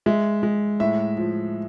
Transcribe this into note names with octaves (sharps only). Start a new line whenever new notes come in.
G#3 E5
G#3
A2 E5
F3